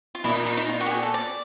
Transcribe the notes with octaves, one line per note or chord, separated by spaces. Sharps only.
F4
A#2 E4
D#4
D#4
D#4
F4
F#4
G4
G#4
A4
D5